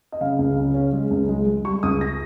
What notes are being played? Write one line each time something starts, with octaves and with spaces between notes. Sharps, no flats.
D#5
C#3 F5
C#2
C#3
C#4
G#3
C#2
G#3
G#3
G3 C#6
C#2 D#6
A#6